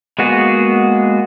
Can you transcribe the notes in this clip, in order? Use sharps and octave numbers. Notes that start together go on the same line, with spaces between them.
G#3 A#3 B3 F#4 G#4